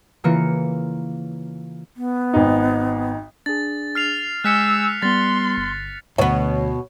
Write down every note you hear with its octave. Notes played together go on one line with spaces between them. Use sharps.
C#3 E3 A#3 F4 C#7
B3
G#1 D#4
D4 G#4 A6
F6 C7 F7
G#3 G#5 E6 F#6 G6 B6 C#7
G3 B3 C6 A6
G1
D2 B2 B3 C#5